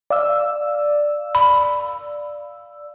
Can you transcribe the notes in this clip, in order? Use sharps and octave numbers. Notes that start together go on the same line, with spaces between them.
D5 F5 E6
B5